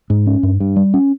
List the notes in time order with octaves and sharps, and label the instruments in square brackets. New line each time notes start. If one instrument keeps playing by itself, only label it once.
[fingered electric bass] G#2
C#4
G2
G2
G3
C#4